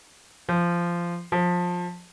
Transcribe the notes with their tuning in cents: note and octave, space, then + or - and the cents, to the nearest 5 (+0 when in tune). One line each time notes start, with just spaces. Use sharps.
F3 -15
F3 +20